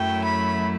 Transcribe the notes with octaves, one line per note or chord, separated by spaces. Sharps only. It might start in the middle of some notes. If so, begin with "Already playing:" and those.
Already playing: F#2 F#3 A3 E4 G5
B5